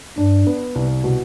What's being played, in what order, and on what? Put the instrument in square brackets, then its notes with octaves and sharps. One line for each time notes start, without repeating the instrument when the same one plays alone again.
[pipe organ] G2 [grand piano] D4
[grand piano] B3
C2
B2